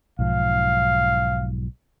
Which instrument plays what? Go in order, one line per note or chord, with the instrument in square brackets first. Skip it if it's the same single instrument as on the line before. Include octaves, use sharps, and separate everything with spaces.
[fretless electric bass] B1 G#2 F3 [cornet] F5